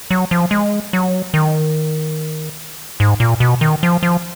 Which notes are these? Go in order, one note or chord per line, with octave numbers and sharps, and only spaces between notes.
F#3
F3
G#3
F#3
D#3
G#2
A#2
B2
D#3
F3
F3